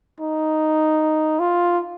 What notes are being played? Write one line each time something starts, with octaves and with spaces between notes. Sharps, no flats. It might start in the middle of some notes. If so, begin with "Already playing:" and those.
D#4
F4